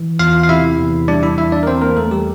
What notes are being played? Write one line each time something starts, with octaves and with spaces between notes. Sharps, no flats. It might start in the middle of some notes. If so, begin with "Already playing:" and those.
Already playing: E3
E2 F4 F5
F5
C3 E4 E5
E2
G3 D4 D5
E4 E5
E2 E4 E5
D4 D5
A#4
E3 C4 C5
A#3 A#4
E2 A3 A4
G3 G4